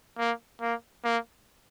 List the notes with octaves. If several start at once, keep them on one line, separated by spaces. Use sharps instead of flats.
A#3
A#3
A#3